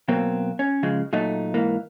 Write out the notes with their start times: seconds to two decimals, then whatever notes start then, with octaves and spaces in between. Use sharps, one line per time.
0.08 B2 F#3 A#3 C4
0.59 C#4
0.83 C#3 F3 G#3
1.13 A#2 F#3 A3 D#4
1.54 G#2 E3 A#3